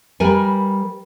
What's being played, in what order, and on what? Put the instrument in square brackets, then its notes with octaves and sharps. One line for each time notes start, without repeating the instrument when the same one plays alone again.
[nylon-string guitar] G3 A#4 B4 G#5